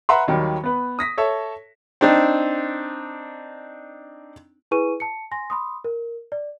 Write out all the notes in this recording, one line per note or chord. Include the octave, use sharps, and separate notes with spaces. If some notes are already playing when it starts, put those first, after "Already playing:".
B4 E5 F#5 A#5 C6
D#2 D#3 F#3 G3
B3 B4
D#6 A#6 B6
A4 C#5 E5
C4 D4 D#4
E4 G#4 B4 G#5 C#6 D#7
A5 C#7
G#5 C6 A#6
B5 C6 D#6
A#4
D5